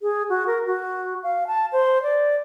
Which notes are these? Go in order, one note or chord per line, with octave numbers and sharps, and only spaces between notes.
G#4
F#4
A#4
F#4
F5
A5
C5
D5